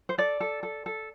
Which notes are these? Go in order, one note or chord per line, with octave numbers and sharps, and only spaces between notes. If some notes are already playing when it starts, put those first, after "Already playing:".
C5
A4 D5
A4
A4
A4